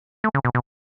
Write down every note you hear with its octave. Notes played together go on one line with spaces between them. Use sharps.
A3
C#3
B2
B2